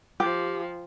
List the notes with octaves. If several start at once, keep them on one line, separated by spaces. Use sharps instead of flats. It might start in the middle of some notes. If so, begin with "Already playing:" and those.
F3 G4